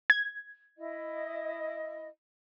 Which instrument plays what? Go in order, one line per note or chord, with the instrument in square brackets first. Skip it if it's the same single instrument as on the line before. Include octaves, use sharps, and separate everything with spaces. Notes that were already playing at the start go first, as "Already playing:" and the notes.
[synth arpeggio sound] G#6
[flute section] E4 D#5